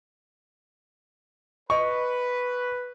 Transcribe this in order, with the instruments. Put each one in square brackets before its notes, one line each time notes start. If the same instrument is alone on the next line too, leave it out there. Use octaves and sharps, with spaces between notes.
[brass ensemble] B4 [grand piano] D#5 C#6